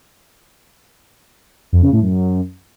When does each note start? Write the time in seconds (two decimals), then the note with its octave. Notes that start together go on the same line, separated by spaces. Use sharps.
1.73 F2
1.82 C#3
1.92 A2
2.02 F#2